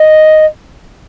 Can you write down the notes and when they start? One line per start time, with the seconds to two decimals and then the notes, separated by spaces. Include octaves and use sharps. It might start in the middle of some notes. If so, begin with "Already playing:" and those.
Already playing: D#5